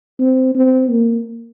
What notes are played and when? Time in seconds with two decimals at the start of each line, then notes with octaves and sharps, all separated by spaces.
0.19 C4
0.55 C4
0.91 A#3